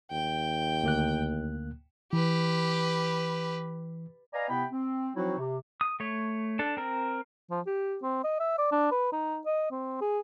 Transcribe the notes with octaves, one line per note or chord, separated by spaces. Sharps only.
D#2 G5
D2 A#3 F#6
E3 G4 B4
B4 D5 D#5 F5 G#5 A#5
C3 B3 E4 G5 B5
C4
F3 F#3 C4 D#4 E4 F#4
C3
D#6
A3 C#5
D4 A4
C4 A#4
F3
G4
C4
D#5
E5
D5
D4
B4
D#4
D#5
C4
G#4